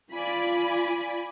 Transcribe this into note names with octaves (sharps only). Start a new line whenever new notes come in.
F4 D5 G#5 B5